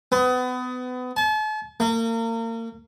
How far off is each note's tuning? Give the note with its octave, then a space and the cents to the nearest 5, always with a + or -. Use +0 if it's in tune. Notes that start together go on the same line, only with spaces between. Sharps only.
B3 +30
A5 -40
A#3 -35